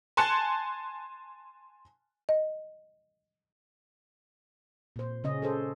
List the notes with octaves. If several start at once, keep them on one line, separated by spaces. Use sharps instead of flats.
G#5 A5 C6 F#6 C#7 E7
D#5
A#2 C5
C#3 C#4 D#5
G#4 A4 C5